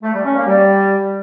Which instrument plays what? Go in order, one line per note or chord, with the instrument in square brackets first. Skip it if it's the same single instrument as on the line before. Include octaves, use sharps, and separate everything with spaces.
[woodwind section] A3
G3
C#4
A#3
G3